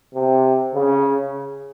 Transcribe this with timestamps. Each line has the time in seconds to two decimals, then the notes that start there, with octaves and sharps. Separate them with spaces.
0.14 C3
0.74 C#3